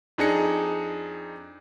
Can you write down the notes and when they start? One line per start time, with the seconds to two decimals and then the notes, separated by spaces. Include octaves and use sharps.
0.18 F2 D4 D#4 G#4 A#6 C#7